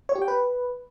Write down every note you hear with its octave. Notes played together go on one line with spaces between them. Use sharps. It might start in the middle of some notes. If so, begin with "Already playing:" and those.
C#5
G4
G5
B4